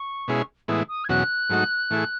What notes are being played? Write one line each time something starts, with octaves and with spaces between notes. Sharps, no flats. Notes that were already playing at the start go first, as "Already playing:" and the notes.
Already playing: C#6
B2 G#3 C#4 E4 G#4
A2 E3 G#3 B3 E4 D#6
D#6
G#6
E2 B2 F#3 C#4 F#4 F#6
G#2 F#3 A3 D#4 F#4
A2 E3 A3 E4 G#4